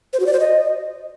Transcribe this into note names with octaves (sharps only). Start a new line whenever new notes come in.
C5
F#4
D5
C5
D#5